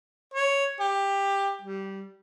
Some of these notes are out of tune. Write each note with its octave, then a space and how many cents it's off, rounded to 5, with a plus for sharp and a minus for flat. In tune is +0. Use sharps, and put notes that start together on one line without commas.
C#5 +5
G4 +15
G3 -15